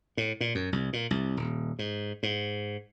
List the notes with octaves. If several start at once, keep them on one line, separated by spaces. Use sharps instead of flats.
A2
A#2
F#2
C2
A#2
C2
D#1
G#2
G#2